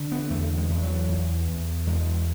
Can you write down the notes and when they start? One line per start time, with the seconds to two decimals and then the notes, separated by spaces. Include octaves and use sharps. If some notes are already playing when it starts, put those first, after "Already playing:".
Already playing: D3
0.12 B3
0.30 E2 A3
0.57 G#3
0.70 E2
0.82 F#3
1.09 E2
1.48 E2
1.87 E2 G#3